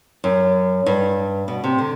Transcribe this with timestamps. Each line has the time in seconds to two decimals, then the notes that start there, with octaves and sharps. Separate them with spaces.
0.24 F#2
0.86 G2
1.48 B2
1.64 C3
1.78 D3